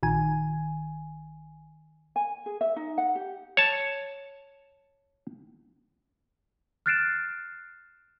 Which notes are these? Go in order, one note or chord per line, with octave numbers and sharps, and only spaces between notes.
A#1 D#3 G#5
G#5
G#4
E5
D#4
F#5
G4
C#5 A5
F6 F#6 A6 C7 D7 E7